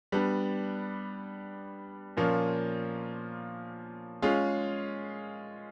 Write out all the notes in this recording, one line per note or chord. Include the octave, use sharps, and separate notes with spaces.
G3 B3 D4
A#2 F3 A#3 C#4
G#3 C#4 F4 G#4